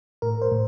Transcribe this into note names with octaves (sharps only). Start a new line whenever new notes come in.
A2 A#4
C5
A2